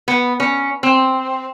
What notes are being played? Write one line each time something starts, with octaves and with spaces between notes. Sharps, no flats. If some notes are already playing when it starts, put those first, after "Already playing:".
B3
C#4
C4